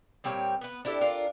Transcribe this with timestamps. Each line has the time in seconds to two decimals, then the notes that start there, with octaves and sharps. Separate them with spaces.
0.24 A#2 G3 C4 C#5
0.61 B3 B4
0.85 D4 E4 G4 A4
1.01 D4 F4 A4 A#4